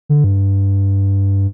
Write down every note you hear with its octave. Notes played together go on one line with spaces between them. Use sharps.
D3
G2